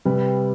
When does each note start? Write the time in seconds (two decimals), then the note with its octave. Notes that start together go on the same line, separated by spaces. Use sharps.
0.05 C3 G3 B4